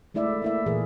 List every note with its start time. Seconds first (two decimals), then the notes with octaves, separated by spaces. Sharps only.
0.14 G#3 A3 E4 D5 E5
0.42 A#3 E4 E5
0.66 A#2 E3 G#4 A#4